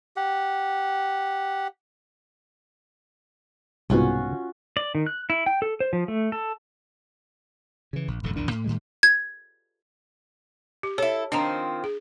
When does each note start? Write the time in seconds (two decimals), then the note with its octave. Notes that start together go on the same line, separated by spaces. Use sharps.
0.16 G4 F#5
3.90 C2 G#2 B2 C#4 F4 F#4
4.77 D5
4.95 D#3
5.06 F#6
5.30 E4
5.46 G5
5.62 A4
5.80 C5
5.93 F3
6.08 A3
6.32 A4
7.93 C#3 E3
8.08 A#1
8.23 E1 F#2 A2 D3
8.36 A#1 E2 D#3 D4
8.51 A2
8.64 A2 D#3 G3 G#3
9.03 G#6
10.83 G4
10.98 E4 A4 C#5
11.32 D#3 F3 C4 D4 A#5
11.84 G#4